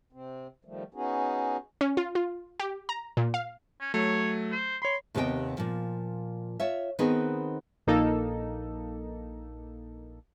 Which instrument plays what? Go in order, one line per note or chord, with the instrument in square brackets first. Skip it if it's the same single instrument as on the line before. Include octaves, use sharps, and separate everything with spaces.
[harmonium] C3 C4
D#3 F3 G3 A3
B3 C#4 D#4 F#4 G#4
[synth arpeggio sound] C#4
F4
F4
G4
A#5
A#2
F5
[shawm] C#4
[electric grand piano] F#3 A3 [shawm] C#5
[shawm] C5
[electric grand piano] C#5 B5 [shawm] C6
[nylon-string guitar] D#2 C3 B3 G4 D#5 G5
A#2 F3
F4 C#5 E5
D#3 B3 C4 D#4 G#4 B4
[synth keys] A#1 A#3 D#4 A4